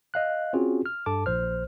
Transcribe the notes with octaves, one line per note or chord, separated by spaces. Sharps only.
D#5 F5 F#6
C4 C#4 F4 F#4 G#4
F6
G2 A4 A5 D6
A#1 C5 F6